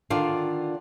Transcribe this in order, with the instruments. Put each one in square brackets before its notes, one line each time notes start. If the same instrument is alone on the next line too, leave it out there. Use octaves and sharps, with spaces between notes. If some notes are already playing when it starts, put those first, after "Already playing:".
[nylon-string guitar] D3 D#3 D4 F4 F5